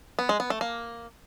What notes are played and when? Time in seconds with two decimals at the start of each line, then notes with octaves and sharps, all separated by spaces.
0.19 B3
0.29 G#3
0.40 B3
0.50 A3
0.61 A#3